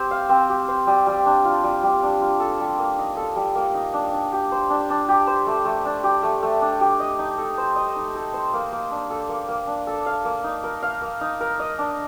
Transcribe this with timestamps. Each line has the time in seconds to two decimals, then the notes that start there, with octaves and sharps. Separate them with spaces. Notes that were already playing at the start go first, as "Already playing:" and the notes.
Already playing: C4 G4 C5
0.11 F5
0.29 C4
0.50 G4
0.68 C5
0.87 G3
1.07 G3
1.26 D4
1.45 F4
1.64 G3
1.83 G3
2.03 D4
2.21 F4
2.40 A4
2.60 G3
2.78 A#3
2.98 D#4
3.17 A4
3.36 G3
3.55 A#3
3.74 D#4
3.93 D4
4.13 D4
4.32 G4
4.52 C5
4.70 D4
4.90 D4
5.09 G4
5.27 C5
5.47 A3
5.65 A3
5.85 D4
6.04 G4
6.23 A3
6.43 A3
6.61 D4
6.81 G4
7.00 D#5
7.19 D#4
7.38 A4
7.58 C5
7.76 D#5
7.96 D#4
8.15 A4
8.33 C5
8.54 A#3
8.72 A#3
8.91 D4
9.10 A4
9.29 A#3
9.49 A#3
9.67 D4
9.87 A4
10.06 F5
10.25 A#3
10.44 D#4
10.64 A#4
10.82 F5
11.02 A#3
11.21 D#4
11.40 A#4
11.59 D#5
11.78 D4